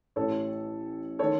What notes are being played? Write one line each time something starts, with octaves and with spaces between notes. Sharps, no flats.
A1 A2 E3 A4 C#5
D#3 A4 C#5